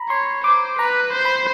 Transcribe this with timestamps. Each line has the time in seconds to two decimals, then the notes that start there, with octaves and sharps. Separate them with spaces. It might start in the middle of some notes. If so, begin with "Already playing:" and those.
Already playing: A#5 B5
0.09 C#5 C6
0.44 C5 D6
0.78 B4 A#5
1.13 C5
1.25 B5